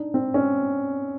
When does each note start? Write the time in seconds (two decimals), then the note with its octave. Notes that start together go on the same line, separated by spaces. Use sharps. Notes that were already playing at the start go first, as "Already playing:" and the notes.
Already playing: D4 D#4
0.14 C4
0.34 C#4